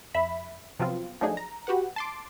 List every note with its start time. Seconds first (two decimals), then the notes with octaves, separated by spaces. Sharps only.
0.14 F2 E5 B5
0.79 C3 F3 F#3 B3 C4 F4
1.21 F3 F#3 A3 D4 D#4 G#4
1.37 A#5
1.67 F#4 G4 B4 F#5
1.96 A5 C6 D6